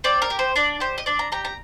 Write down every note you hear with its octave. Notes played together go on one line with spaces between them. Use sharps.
C4 D5
A#4
G4
C5
D4 D5
G4 C5
D#5
D4 D5
A#5
G4 A#5
A#5